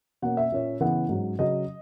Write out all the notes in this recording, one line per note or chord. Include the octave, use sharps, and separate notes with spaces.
B2 A#3 C#4 F#5
E5
A#2 A#3 C#4
C#3 E3 B3 F#5
G#2 F#3 C#4
C#3 F#3 C#4 D#5